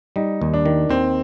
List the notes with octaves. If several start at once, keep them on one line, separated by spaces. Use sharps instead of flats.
G3 D#4
D#2
D4
D#3
D#2 C4